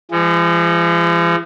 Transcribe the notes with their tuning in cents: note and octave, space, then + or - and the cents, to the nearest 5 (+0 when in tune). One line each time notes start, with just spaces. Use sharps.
F3 -45 G#3 -30